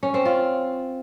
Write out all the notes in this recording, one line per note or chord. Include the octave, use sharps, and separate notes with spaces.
C#4
C4
F4